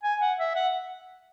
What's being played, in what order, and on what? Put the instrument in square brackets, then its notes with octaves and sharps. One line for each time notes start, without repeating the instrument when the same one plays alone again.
[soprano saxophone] G#5
F#5
E5
F#5